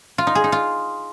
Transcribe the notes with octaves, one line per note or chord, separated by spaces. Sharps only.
F4
D#4
G#4
D#4
F4